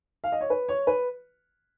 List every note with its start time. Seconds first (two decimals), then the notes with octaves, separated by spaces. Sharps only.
0.24 F5
0.32 D#5
0.41 C#5
0.50 B4
0.69 C#5
0.87 B4